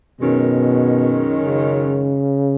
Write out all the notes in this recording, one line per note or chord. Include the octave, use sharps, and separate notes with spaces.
F#2 B2 D#3 G#3 C#4
C#3